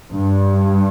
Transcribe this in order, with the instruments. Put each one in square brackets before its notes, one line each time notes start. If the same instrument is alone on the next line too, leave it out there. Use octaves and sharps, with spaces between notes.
[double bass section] G2